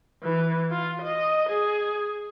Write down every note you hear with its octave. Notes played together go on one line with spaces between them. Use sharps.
E3
F4
D#5
G#4